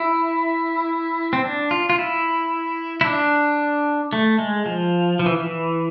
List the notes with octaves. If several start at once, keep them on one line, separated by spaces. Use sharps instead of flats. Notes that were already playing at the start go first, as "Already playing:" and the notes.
Already playing: E4
C4
D4
F4
F4
E4
E4
D4
A3
G#3
F3
F3
E3
E3